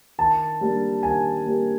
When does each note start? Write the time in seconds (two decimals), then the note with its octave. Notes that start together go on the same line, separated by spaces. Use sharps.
0.18 D#3 A5
0.61 G3 A#3 D4 G4
1.03 D#3 G#5
1.45 G3 A#3 D4 G4